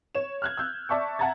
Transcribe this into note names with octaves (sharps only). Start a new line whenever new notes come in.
C#5 E7
F6 F#6 G#6
E6 G6
D5 E5 A5 C#6
E5 F#5 A5 A#5 G#6 A6